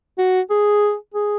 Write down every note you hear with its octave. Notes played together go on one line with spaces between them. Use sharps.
F#4
G#4
G#4